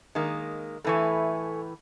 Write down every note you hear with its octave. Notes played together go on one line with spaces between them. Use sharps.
D#3 G#3 A#3
A2 E3 A3 A4 G#5 C#6